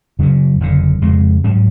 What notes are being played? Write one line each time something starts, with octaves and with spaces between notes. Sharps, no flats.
F#2 C#3 F#3 C#4
F#1 F2 D3
F2 C#3 G#3
G#2 F#3 C#4